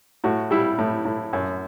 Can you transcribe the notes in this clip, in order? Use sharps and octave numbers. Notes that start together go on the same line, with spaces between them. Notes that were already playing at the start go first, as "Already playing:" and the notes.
A2 F#4
G3 E4
A2
A2
F#2